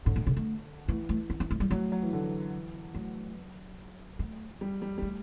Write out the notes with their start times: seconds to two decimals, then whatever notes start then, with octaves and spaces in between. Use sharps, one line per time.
0.05 A2 D3
0.16 A2
0.27 C3
0.37 A3
0.88 E3 A3
1.09 A3
1.30 B3
1.40 B3
1.51 A3
1.60 G3
1.71 F#3 A3
1.92 F#3
2.02 E3
2.13 D3
2.22 E3
2.95 F#3 A3
4.19 A3
4.61 G3
4.82 G3
4.98 G3
5.02 A3